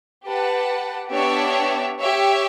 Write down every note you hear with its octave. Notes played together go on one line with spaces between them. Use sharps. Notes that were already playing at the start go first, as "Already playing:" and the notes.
G4 B4 F#5 A5
B3 D4 G4 C#5 E5
G4 C#5 E5